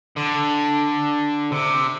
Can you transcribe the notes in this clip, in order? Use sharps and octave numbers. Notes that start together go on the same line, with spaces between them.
D3
C3